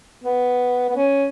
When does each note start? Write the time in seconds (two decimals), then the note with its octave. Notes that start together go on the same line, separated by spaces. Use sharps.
0.24 B3
0.89 B3
0.96 C#4